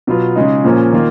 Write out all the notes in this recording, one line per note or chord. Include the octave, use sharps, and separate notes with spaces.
B2 F#3 B3 F4
C#3 G#3 D#4
A#2 F3 A#3 C#4
D#3 A#3 F4